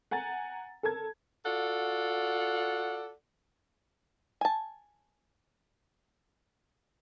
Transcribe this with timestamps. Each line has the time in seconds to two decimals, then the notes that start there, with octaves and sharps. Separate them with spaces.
0.11 F#5 G#5 A#5 A6
0.83 A4 A#4 A5 G#6
1.45 F4 F#4 A4 D5 F#5
4.41 G#5 A5